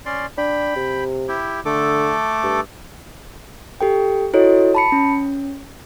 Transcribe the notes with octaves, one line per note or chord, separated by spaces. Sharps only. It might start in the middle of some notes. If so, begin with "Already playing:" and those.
C#4 D5 C6
D4 G5 B5
C3
E4 G4
D3 A3 A4 D6
G2
G4 A4 G5
E4 F#4 A4 C#5 D#5
A5 B5 C#7
C#4